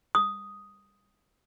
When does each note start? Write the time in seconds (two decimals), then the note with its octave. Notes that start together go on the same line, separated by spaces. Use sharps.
0.15 D#6